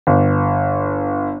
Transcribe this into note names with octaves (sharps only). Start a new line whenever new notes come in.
G1